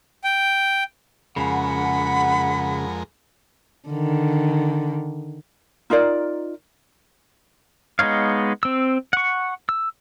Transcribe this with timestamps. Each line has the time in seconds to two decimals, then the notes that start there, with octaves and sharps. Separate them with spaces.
0.24 G5
1.36 F2 C#3 G#3 A#4 F#5 B5
3.89 D3 D#3
5.90 D#4 F4 A#4 D5
7.99 G#3 B3 D#4 C#5 F5
8.63 C4 E6
9.13 F#5 C#6
9.69 E6